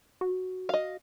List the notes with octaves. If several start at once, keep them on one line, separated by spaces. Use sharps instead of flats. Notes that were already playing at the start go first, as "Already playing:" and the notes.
F#4
D#5 F5